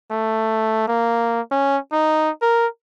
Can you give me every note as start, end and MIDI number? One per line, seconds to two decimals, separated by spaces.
0.11 0.86 57
0.88 1.40 58
1.51 1.78 61
1.92 2.30 63
2.42 2.67 70